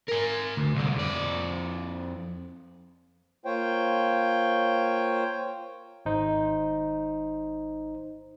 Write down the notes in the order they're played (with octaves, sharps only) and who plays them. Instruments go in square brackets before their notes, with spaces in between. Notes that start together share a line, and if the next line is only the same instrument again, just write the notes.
[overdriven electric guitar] A#4 G#5
D2
C2 D3
F2 D5
[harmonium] A#3 F4 C5 C#5 G5
[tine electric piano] G#1 D#4 C5